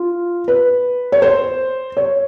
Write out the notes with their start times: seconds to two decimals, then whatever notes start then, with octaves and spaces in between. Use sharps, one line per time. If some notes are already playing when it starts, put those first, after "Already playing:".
Already playing: F4
0.48 B4
1.12 C#5
1.22 C5
1.97 C#5